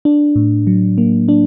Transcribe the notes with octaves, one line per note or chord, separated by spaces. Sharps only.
D4
A2
F#3
A#3
D4